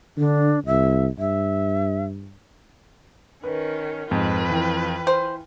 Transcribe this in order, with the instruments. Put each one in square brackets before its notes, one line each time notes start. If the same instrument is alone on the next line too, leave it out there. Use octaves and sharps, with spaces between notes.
[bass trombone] D3 [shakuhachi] D4
[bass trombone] C2 [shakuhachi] E5
[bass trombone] G2 [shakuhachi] E5
[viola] D#3 C#4 [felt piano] B4
[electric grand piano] F2 [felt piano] G#2 [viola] F4 B4
[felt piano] E3 G5
[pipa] C5